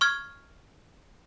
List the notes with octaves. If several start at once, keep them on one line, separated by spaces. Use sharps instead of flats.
C#6 F6 G#6